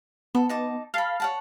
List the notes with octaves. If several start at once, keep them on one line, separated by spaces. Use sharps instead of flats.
B3 A4
D#4 A5 D6
A4 F5 B5
C#5 F#5 A5